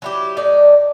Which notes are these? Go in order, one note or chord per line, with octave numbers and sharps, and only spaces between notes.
F#3 E4 G4
A2 D#4 D5